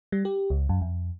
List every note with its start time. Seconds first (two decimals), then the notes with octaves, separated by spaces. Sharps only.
0.12 G3
0.25 G4
0.50 C#2
0.69 F#2
0.81 F2